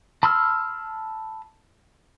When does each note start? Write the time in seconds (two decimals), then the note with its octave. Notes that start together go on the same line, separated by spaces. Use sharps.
0.23 A5 B5 C6 E6 F6